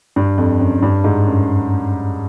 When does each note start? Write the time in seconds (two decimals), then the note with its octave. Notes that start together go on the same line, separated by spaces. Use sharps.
0.16 G2
0.38 F2
0.60 F#2
0.82 G2
1.04 G#2
1.27 F#2